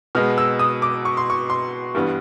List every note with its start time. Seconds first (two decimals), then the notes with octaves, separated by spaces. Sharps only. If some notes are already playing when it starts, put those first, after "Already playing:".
0.15 B2 G#3 B3 F6
0.38 E6
0.59 D#6
0.82 D6
1.05 C#6
1.17 C6
1.30 C#6
1.50 C6
1.95 G2 E3 G3 B3